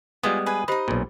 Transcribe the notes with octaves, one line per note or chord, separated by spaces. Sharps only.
G3 G#3 B3 E4 F4 G#5 D#6
G#4 B4 G#5
D#4 G4 C5 D#5 B5
B1 A#2